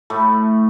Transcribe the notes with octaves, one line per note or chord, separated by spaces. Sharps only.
A2 A3